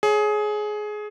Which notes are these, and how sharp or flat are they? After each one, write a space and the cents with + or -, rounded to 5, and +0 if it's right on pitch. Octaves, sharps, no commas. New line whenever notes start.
G#4 +20 C#5 +0